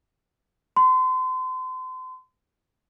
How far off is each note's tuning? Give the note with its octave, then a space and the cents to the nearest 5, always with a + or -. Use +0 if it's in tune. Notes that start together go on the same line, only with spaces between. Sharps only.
C6 -35